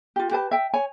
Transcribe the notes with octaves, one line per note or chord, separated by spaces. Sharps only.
F4 G4
G4 B4 A5
E5 G5
C#5 G#5